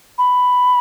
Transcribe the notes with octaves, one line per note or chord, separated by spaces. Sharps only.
B5